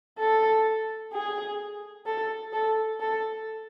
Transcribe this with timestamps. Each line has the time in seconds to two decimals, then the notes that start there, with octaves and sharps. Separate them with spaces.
0.19 A4
1.13 G#4
2.06 A4
2.53 A4
3.00 A4